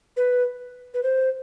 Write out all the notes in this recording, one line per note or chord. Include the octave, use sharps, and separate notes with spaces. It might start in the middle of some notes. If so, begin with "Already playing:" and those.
B4
B4
C5